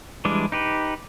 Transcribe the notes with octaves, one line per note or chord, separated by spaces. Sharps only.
E3 G3 G#3 D4
D#4 G4 B4